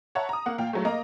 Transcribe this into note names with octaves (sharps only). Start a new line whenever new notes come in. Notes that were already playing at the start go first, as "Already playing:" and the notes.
C#5 E5 F#5 A5 A#5
A#5 D#6
A#3 F#5
A#2 F5 G5
G#2 F#3 A3
A#3 D#5 A#5